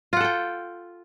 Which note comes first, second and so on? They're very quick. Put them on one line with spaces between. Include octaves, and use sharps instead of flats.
F4 F#5 A4 G5